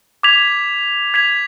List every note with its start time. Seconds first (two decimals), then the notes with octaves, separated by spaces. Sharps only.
0.23 D6 G#6 B6 F7
1.14 G#6 B6 F7